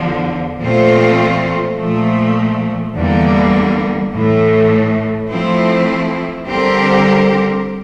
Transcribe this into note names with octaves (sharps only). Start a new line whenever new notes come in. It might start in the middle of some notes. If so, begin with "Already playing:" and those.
Already playing: E2 D3 F3
A#2 F3 A3 C4 F4
A#2 F3 A3
E2 D3 G3 A#3
A2 E3 A3
F3 A3 C4 E4
D3 G3 C4 G4 A#4